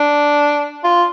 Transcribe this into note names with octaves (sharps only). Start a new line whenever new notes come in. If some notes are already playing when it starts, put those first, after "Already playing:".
Already playing: D4
F4